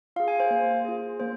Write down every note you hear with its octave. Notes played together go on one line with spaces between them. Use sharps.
F4 G#4 F5
G#5
C5 F5
A#3
F4 G#4
A#3 C5